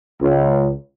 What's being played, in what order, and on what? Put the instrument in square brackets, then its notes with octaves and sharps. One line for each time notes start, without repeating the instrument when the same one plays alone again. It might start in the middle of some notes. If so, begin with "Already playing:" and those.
[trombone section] C#2